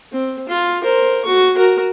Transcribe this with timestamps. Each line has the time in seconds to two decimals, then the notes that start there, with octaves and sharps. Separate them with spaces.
0.12 C4
0.48 F4
0.83 A#4 C5
1.25 F#4 C#6
1.56 F#4 A#4